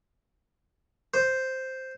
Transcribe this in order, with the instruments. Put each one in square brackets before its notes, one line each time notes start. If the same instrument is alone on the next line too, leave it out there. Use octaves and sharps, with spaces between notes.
[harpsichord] C5